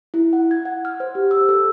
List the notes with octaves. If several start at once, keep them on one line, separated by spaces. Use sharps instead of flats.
E4
F#5
G#6
F#5
F6
C5
G4
E6
A4